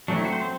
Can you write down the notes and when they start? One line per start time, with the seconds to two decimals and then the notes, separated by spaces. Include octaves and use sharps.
0.08 F#3 A3 C4 D4
0.16 E4
0.25 F#4
0.33 C5
0.42 C4